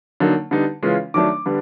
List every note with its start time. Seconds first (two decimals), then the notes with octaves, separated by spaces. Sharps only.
0.20 D3 F#3 A#3 D#4
0.51 D3 G3 B3 D#4
0.83 C#3 E3 G#3 C#4 F4
1.14 D#3 F#3 A3 D4 D6
1.46 D3 G3 B3